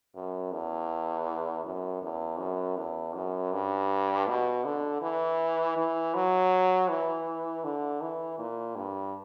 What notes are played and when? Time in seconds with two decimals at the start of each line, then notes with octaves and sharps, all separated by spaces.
0.15 F#2
0.52 E2
1.65 F#2
2.02 E2
2.39 F#2
2.77 E2
3.15 F#2
3.52 G2
4.27 B2
4.65 D3
5.01 E3
5.76 E3
6.15 F#3
6.89 E3
7.64 D3
8.01 E3
8.38 A#2
8.76 G2